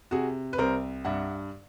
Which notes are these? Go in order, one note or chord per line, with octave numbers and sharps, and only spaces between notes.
C3 F#4 G#4
B4
C2 A#4 C5
G2 E5 F#5